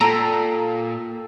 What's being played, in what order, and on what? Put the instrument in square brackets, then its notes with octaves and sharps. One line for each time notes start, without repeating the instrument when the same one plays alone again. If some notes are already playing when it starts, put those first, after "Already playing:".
[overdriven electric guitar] A#2 [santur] A4 G5 [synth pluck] A#5